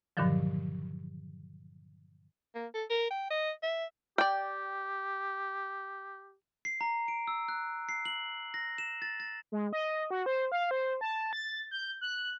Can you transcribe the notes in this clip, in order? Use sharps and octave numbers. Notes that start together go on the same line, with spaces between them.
G2 A#2 D3 D#3 F3 F#3
A#3
A4
A#4
G5
D#5
E5
G4 D5 G5
C7
A#5
D7
E6
F#6
C7
F#7
A#6
E7
A6
A6
G#3
D#5
F#4
C5
F5
C5
A5
A6
G6
F#6